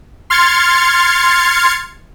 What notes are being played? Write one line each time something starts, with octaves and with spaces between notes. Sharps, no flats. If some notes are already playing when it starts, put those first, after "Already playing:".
C6 F6 G#6 A6 C#7